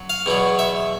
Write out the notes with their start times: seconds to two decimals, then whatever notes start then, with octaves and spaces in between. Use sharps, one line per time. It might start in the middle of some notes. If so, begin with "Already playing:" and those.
Already playing: F#3
0.10 F5
0.26 E2 B2 F#3
0.59 E5